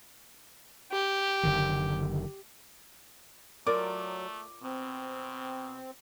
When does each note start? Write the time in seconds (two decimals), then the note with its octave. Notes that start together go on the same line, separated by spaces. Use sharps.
0.92 G4
1.43 F#1 D3 D#3
3.67 F#3 A3 F4 A#4 D5 D6
4.63 B2 C4